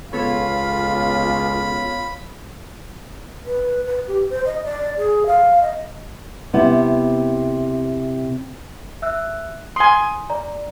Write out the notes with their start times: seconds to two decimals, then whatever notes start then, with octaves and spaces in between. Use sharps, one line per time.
0.13 C#2 B3 F4 A4 C#5 B5
3.45 B4
3.86 B4
4.07 G4
4.30 C5
4.46 D#5
4.64 D5
4.98 G#4
5.26 F5
5.62 D#5
6.53 C3 B3 E4
9.02 E5 E6 F#6
9.76 G#5 C6 D#6
10.30 D5 A#5